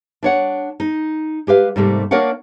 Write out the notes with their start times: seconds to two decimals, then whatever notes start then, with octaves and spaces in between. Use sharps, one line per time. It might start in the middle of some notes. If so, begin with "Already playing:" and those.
0.23 D4 C#5 F#5
0.80 D#4
1.47 G#3 G4 B4 F5
1.76 G#2 C3 G3 A3 A#3
2.11 A#3 D4 A#4 C#5 F5 F#5